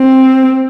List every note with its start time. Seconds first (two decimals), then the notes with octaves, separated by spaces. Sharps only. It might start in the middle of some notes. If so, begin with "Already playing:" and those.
Already playing: C4